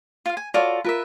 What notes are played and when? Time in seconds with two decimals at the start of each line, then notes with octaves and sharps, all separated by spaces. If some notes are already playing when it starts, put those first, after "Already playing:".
0.26 F4 F5
0.37 G#5
0.54 F4 F#4 A4 C#5 D5
0.84 F4 A#4 B4 E5